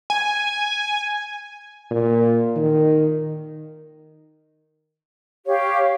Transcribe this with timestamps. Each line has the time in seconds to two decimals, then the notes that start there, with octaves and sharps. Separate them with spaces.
0.10 G#5
1.91 A#2
2.56 D#3
5.46 G4 C#5 F5